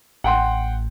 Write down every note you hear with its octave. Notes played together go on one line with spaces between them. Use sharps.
A1 F#5 G5 C6